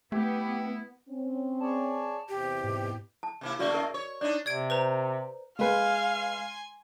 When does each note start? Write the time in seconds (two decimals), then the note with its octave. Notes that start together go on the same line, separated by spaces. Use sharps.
0.12 A3 B3 E4 G4
1.09 C4 C#4
1.60 G#4 C#5 D5 A5
2.29 E2 C3 G4
2.63 G#2 B2
3.23 A5
3.41 C3 A#3 E4
3.59 C#3 A3 A#3 F#4 D5
3.74 A#4 D#5
3.94 C#5
4.21 D4 D#4 D5
4.46 C3 D5 G#6 D7
4.70 B4 C5 A#5
5.59 G#3 B4 F5 G#5 C6